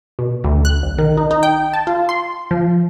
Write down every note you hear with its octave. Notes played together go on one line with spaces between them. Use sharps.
B2
D2
F#6
B1
D#3
D#4
D#4
G5
A5
F4
C6
F3